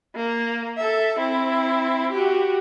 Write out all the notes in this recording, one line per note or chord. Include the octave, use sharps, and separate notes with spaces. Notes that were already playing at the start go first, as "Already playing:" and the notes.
A#3
A4 E5
C4 E4
F#4 G4